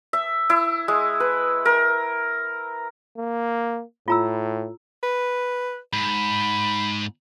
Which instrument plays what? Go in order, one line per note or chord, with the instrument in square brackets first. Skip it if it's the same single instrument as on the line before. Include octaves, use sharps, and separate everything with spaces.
[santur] E5
E4
G#3
B4
A#4
[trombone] A#3
[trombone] A2 [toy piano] F4 A#5 E6
[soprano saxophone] B4
[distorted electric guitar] G#2 [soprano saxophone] B5